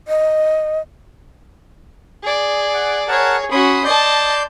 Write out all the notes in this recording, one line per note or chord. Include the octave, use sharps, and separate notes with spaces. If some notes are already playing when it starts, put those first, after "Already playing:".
D#5
G#4 D5
F#5
G#4 A#4 C#5 F#5 A5
C#4 F#4 B5 C6 D#6
D5 D#5 A5 C6 G6